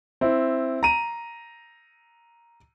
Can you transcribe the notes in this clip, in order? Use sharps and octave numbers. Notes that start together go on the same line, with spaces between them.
C4 E4
A#5 D#7